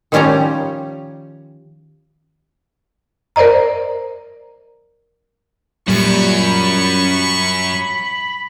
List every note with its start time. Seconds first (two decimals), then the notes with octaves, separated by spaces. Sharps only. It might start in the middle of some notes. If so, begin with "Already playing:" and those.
0.12 D#3 F3 G3 C#4 G4 A#5
3.36 A#4 C5 D5 D#5 A#5
5.88 F#2 A#2 G3 B5 C#6